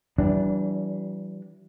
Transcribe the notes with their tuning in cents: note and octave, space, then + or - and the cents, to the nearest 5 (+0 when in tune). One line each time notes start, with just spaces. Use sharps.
E3 +0 G3 -45 D4 -20